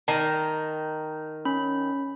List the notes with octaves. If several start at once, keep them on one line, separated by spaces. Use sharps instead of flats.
D#3 A5 A#5
C#4 B5